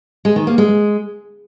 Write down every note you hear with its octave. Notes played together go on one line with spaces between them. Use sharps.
G#3
D#3
A#3
G#3